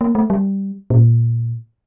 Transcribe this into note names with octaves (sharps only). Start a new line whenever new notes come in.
A#3
A3
G3
A#2